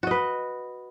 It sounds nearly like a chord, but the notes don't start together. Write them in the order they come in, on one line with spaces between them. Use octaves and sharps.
F#4 D#5 B4